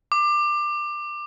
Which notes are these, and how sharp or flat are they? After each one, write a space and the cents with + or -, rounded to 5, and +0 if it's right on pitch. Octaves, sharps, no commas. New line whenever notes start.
D6 +20